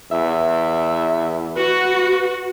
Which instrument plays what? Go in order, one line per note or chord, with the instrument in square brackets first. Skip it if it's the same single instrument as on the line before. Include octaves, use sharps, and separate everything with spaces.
[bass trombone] E2 [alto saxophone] E5
[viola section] F#4 [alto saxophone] B4